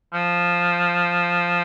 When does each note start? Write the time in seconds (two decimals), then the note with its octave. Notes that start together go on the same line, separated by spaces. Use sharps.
0.14 F3